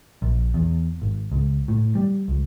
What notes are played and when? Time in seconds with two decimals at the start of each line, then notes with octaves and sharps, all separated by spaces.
0.22 A#1
0.54 E2
1.02 G#1
1.32 C#2
1.68 A2
1.95 G3
2.28 C#2